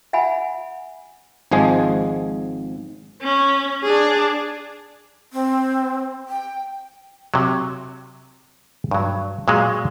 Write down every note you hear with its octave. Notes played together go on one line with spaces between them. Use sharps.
E5 F#5 G#5 B5
G#1 G#2 F3 G#3 G#4
C#4
D4 G#4
C4
G5
C3 F#3
G2 F#3
A#2 F#3 G#3